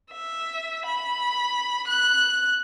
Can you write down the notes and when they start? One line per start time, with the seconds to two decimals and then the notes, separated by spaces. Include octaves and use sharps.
0.12 E5
0.86 B5
1.87 F#6